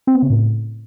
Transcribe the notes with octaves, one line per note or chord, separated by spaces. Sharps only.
C4
B3
C#3
A2